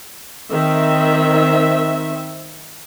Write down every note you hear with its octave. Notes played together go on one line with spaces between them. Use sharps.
D#3 C4 E5